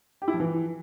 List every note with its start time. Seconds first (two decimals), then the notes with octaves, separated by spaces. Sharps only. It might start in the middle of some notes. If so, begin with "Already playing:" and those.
0.22 G4
0.28 E4
0.34 F3
0.40 E3